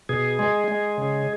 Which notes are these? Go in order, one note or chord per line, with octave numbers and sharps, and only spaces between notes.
B2 G#4
G#3
G#3
C#3